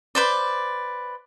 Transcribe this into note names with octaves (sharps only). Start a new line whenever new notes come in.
B4 C5 D5